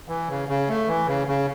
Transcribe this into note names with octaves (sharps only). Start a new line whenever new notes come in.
E3
C#3
C#3
A3
E3
C#3
C#3